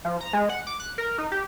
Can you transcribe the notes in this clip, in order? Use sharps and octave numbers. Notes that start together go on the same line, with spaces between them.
F3
A#5
G#3
F#5
D6
F#6
A#4
D#4
G4